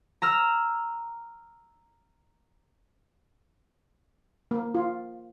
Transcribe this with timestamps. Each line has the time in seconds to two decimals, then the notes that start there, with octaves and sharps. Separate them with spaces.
0.22 A#5 E6 F6
4.51 A#3
4.75 F4